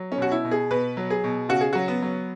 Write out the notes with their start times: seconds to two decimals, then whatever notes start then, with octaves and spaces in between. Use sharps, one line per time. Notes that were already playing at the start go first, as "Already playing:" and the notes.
Already playing: F#3
0.12 C#4
0.18 B2 F#4
0.32 E4
0.45 B2
0.51 G#4
0.71 B2 B4
0.97 F#3
1.10 G#4
1.24 B2
1.49 C#3 F#4
1.61 G#4
1.73 F#3 F#4
1.88 B3
2.02 F#3